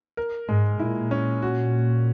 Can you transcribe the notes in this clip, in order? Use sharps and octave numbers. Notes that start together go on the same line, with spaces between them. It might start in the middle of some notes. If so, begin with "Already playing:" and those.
A#4
G#2 G#3
A#2 E4
C#4
A#2 F#4